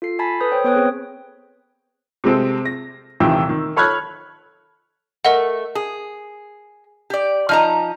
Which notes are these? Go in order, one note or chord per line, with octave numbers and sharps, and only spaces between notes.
F4 A4 C7
G#5 A5 B5 A6 B6
A4 B4 D#6 G6
C5 C#5 G5
B3 B4 C#5 G5 D#6 F#6
C4 G#4
C3 G#3 C4 A4
A#6
D#1 C3 D#3 E3 G5 E6
D#3
A4 C#5 B5 F6 F#6 G#6
A3 A#4 D#5 F#5
G#4
G4 D5
F3 D#4 A#5 F6